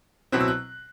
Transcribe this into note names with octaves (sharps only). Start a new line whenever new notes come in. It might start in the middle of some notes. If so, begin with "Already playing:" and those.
B2 F#3 C4 E4 F#6
E6
F#6